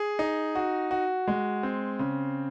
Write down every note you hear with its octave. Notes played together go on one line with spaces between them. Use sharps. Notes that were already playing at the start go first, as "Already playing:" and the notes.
Already playing: G#4
D#4
F#4
F#4
G#3
C4
C#3